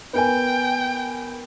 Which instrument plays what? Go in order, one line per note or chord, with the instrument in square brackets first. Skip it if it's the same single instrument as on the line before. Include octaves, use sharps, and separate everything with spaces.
[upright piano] B3 A#4 G#5 [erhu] G5